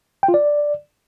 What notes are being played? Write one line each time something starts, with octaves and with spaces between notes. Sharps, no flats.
G5
F4
D5